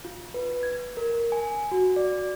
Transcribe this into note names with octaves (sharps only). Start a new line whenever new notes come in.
F4
B4
G#6
A#4
G#5
F#4
D5